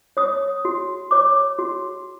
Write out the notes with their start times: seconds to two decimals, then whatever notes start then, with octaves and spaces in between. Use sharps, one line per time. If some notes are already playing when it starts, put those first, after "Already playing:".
0.17 C#5 D#6
0.65 F#4
1.11 C#5 D6
1.59 F#4